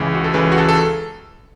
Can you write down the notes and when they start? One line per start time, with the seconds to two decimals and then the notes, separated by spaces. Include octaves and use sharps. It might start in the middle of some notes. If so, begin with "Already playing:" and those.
Already playing: C#2 C#3 E3
0.15 F#4
0.24 A4
0.34 C#2 C#3 E3 B4
0.52 F#4
0.58 A4
0.69 A4